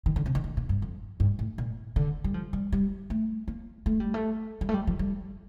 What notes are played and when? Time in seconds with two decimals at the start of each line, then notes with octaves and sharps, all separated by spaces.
0.06 D#3
0.16 D3
0.26 C3
0.35 D#3
0.44 D3
0.57 A#2
0.69 G2
0.82 F2
1.20 G2
1.39 A2
1.58 A#2
1.96 D3
2.24 G3
2.34 F3
2.53 G3
2.72 G3
3.10 A3
3.48 A#3
3.86 A3
4.00 G3
4.14 A3
4.61 G3
4.69 A3
4.74 G3
4.87 F3
4.99 G3